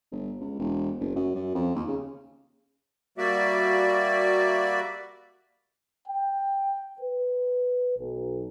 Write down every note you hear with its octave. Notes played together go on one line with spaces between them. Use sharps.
G1
C#2
E1
F#1
F#2
F#2
F2
D#2
C#3
G3 A#3 F#4 D5 E5
G5
B4
B1